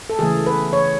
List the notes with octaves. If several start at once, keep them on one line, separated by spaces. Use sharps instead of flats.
A4
C#3 E3 A3 G#4
B4
C#5